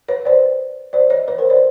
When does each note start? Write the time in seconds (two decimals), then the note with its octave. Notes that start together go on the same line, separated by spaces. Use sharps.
0.08 B4 C#5
0.25 C5 D5
0.93 C5 D5
1.10 C#5 D#5
1.28 B4 C#5
1.38 A#4 C5
1.50 C5 D5